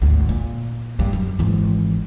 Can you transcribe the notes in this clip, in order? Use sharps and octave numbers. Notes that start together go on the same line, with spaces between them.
G#1 D2
A#2
G2
F#2
G#1 E3